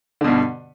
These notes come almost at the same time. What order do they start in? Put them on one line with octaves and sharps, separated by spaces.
D3 B2 G2